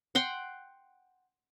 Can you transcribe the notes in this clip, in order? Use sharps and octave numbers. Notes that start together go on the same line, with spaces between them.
F#5 G5 C6